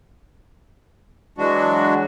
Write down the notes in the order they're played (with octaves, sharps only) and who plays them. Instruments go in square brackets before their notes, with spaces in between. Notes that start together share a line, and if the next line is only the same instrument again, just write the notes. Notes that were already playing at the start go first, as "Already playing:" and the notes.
[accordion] E3 F#3 G#3 D4 F#4